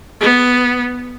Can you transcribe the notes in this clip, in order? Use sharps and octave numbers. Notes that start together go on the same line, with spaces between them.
B3